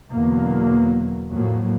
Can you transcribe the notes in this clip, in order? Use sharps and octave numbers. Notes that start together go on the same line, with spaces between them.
E2 B2 D3 F#3 A#3
F2 A2 F#3 A#3